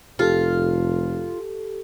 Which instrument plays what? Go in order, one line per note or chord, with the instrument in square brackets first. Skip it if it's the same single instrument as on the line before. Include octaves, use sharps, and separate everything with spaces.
[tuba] F1 [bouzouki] F4 [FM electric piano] G4 A4